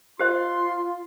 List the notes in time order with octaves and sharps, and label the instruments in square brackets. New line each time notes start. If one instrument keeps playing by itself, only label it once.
[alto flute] F4 [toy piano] G4 C5 D#5 [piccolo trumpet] C6